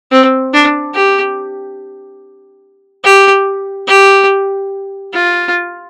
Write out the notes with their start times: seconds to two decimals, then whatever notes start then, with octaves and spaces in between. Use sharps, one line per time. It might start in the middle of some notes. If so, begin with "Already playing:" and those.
0.11 C4
0.53 D4
0.94 G4
3.04 G4
3.87 G4
5.13 F4